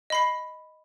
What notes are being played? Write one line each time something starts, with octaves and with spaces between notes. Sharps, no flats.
D#5 B5 C7